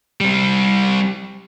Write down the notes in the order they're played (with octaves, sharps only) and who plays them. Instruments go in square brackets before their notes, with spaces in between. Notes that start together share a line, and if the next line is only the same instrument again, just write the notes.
[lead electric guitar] G3 C4